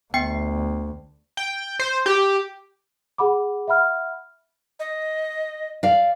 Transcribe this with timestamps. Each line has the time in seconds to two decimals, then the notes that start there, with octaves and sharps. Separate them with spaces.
0.14 D2 B3 G5 C7
1.37 G5
1.79 C5
2.06 G4
3.18 G#4 F#5 B5 D6
3.68 E5 F#5 B5 F6
4.79 D#5
5.83 D5 F5